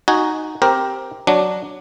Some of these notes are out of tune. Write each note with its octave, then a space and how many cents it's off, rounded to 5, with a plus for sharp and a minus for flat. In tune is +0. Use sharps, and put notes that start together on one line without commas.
D#4 +0 F#4 +0 G#5 +5
C4 +0 G4 +0 A#4 +10
F#3 +0 D4 +0